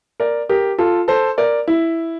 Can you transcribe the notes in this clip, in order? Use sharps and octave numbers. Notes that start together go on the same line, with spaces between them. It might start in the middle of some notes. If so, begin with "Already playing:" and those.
A#4 D5
G4 A#4
F4 A4
A4 C5
A#4 D5
E4